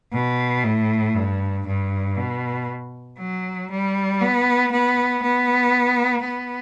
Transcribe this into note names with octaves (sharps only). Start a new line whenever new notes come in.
B2
A2
G2
G2
B2
F#3
G3
B3
B3
B3
B3